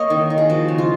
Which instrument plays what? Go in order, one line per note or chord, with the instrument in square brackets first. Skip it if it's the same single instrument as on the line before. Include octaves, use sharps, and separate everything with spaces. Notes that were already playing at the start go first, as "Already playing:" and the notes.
Already playing: [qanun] A#3 C#5 D#5
D#3
D#3
G#4
F3 F#4
C#3
F4